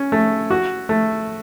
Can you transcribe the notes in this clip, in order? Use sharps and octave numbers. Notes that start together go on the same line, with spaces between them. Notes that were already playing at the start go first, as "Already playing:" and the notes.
Already playing: C#4
A3
F#4
A3